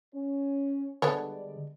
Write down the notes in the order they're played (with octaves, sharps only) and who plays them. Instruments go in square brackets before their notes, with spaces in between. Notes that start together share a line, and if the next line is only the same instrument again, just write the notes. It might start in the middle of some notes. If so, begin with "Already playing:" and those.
[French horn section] C#4
[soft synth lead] D3 [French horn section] G3 G#3 D5 [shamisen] B3 A4 C#5